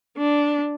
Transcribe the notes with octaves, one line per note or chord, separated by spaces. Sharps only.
D4